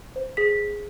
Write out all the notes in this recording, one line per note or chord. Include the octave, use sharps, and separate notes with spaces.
C5
G#4 B6